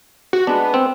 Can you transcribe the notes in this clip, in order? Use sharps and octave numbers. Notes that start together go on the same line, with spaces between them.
F#4
G#3 B3 D4
C4